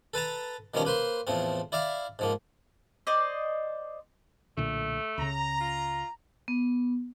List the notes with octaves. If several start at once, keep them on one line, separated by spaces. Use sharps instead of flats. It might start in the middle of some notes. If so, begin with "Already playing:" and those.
A4 B4 A5 A#5
B2 D#3 F3 G3 C#4 A#5
A#3 B4 C5 C6
E2 A2 F3 C4
E4 D5 E5 F5
G#2 F3 A#3
C5 D5 D#5
B1 A#2 D3 A3
C#2 C#3 A#5
F4
B3